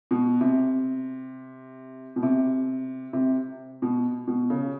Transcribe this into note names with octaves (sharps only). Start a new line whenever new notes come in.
B2
C3
B2
C3
C3
B2
B2
C#3